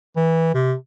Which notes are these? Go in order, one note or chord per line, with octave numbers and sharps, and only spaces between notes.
E3
C3